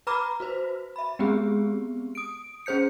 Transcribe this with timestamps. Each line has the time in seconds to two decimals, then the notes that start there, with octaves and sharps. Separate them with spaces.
0.07 B4 A#5 B5 D6 F6
0.40 F#4 B4 C5
0.96 E5 B5
1.19 G#3 B3 C4 G4 G#4
2.15 D#6 D7
2.66 C#4 G#4 C5 G6 C#7